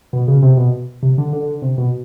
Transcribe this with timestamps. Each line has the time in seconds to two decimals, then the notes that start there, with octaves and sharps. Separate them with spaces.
0.13 B2
0.28 C#3
0.42 C3
0.57 B2
1.03 C3
1.18 D3
1.33 D3
1.62 C3
1.78 B2